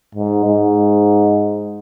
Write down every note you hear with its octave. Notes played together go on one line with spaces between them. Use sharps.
G#2
G#2